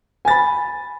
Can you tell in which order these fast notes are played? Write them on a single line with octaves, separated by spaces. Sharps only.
G#5 A6 B5